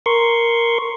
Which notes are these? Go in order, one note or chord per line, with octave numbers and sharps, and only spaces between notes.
A#4 C6 C#6